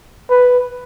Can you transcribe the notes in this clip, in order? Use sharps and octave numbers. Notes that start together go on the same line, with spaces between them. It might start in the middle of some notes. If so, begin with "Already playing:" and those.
B4